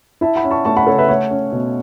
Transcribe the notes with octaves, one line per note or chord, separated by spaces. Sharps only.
E4 E5 A5
F#5 B5
C#4
A5 C#6
A3 A5 C#6
F#5 B5
C#3 A4 C#5
B4 E5
A3 C#5 F#5
C#4
B2